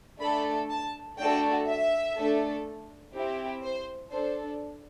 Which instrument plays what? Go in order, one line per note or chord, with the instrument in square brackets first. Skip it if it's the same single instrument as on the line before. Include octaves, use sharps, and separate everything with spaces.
[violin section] A3 D4 A4 B5
A5
A3 D4 F#4 A4 G5
E5
A3 D4 A4
C4 E4 G4
C5
D4 A4 C5